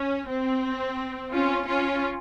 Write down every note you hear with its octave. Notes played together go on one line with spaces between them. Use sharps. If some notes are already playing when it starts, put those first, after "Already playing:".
Already playing: C#4
C4
C#4 F4
C#4 F4